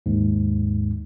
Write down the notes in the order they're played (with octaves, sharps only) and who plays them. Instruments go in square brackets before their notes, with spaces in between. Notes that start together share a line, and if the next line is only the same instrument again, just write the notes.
[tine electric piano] D#2 G#2